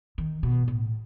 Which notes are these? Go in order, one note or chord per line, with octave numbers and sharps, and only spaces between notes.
D#3
B2
A2